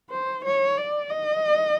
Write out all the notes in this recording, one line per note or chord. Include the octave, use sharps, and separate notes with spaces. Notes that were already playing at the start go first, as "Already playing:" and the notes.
C5
C#5
D5
D#5